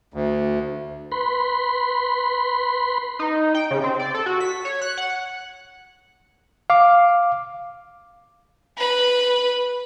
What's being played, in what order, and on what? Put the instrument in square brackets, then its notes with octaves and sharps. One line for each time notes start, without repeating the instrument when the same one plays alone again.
[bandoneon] D2
[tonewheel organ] B4 B5 C6
[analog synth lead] D#4
G5
C#3
C4
D5
A4
F#4
B6
C#5
F#6
F#5
[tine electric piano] F5 D6
[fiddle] B4 B5